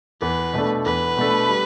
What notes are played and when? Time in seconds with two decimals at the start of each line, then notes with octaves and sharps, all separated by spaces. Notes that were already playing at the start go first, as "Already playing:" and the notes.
0.22 E2 B4
0.53 B2 A3 D4 A4
0.85 E2 B4
1.17 B2 A3 D4 A4
1.49 G3